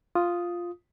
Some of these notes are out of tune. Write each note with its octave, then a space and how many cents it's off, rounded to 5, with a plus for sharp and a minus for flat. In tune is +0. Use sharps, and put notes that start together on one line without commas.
F4 +0 D#6 +0